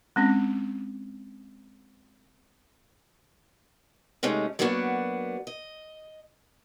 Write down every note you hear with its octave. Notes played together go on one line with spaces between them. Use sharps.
G#3 C4 C#4
C3 G#3 A3 C#4 D#4
F#3 G3 A#3 B3 D4 F#4
D#5